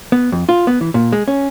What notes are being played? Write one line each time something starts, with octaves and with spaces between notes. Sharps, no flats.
B3
F2
F4
B3
E3
A#2
G#3
C#4